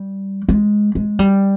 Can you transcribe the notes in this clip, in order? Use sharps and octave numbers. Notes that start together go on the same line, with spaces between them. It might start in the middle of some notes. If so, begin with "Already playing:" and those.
Already playing: G3
G#3
G#3
G3